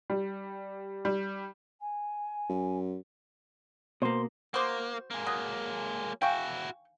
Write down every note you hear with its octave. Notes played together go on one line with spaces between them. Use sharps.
G3
G3
G#5
F#2
B2 A#3 C5
A#3 F#4 C5 C6 D6 D#6
G#3 A#3
F#3 D#6
E4 F#4 F5 G5 G#5 C#6 G6